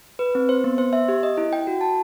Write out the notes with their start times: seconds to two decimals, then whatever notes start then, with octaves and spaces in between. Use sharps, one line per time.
0.19 B4
0.35 C4
0.49 C5
0.64 B3
0.78 C5
0.93 E5
1.08 G4
1.23 D#5
1.38 E4
1.53 G5
1.67 F#4
1.81 A5